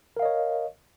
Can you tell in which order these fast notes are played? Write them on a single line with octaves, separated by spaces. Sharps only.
A#4 F5 D#5 C#5